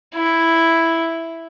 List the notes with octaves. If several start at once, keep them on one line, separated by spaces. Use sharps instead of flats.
E4